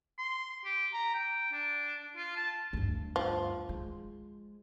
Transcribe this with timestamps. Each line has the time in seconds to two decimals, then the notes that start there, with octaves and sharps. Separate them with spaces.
0.19 C6
0.65 G4
0.93 A#5
1.14 G5
1.52 D4
2.16 F4
2.36 A5
2.73 D2 G2
3.16 F3
3.69 G#3